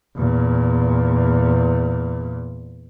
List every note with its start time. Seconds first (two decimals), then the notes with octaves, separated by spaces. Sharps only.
0.16 E2 A#2